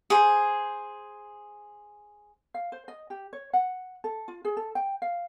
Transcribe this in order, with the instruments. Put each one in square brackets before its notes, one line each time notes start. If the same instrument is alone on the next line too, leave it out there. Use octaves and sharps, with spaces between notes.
[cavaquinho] G#4 C5
[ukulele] F5
C5
D#5
G4
C#5
F#5
A4
F4
G#4
A4
G5
F5